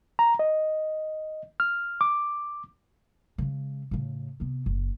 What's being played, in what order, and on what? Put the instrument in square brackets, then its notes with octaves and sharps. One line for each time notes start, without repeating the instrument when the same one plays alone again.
[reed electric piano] A#5
D#5
F6
D6
[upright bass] C#3 G#3
A2 C#3
C3 B3
F#1